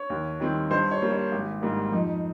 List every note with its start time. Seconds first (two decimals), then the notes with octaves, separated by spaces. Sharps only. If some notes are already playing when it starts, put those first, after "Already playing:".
Already playing: C#5
0.10 D#2
0.40 D#3 G3 C4
0.70 G2 C5
0.91 C#5
1.01 G3 A#3
1.11 C#5
1.32 G#1
1.61 G#2 G3 A#3
1.92 F2 D#4